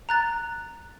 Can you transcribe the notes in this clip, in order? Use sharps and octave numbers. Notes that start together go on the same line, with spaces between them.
A#5 F#6 A6